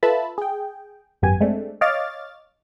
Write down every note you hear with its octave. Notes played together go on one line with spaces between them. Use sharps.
F4 A4 B4 E5 A5 B5
G#4 G5
G#1 F#2 B3 G4 G#5
G#3 A3 C4 D4
C#5 D#5 F5 D6 F6 A6